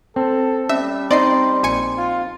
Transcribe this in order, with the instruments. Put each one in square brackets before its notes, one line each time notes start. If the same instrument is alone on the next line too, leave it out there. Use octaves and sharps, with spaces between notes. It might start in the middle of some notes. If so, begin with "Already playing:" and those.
[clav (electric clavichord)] C4 [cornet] A4
[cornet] G3 [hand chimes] C#4 [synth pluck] E5
[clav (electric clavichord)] C4 D#4 [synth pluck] D5 D#5 C7 [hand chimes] C6
[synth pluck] A#1 G#5 C#7
[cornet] F4